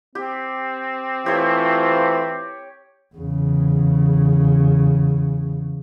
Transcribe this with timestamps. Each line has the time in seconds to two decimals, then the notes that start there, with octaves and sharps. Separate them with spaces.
0.15 C4 G4
1.26 E3 A3 F4 G4 C5 C#5
3.16 E2 C#3